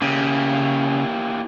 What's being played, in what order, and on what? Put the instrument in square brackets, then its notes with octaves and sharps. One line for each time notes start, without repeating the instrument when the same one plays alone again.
[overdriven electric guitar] C#3 [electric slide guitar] A#3 E4 G4